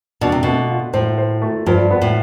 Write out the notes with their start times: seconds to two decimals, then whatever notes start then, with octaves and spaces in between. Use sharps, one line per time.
0.21 B2 D4
0.32 C3
0.43 B2 A3
0.70 F4
0.94 A2 C5
1.18 C5
1.42 A3
1.66 G2 F3
1.91 B3
2.02 A2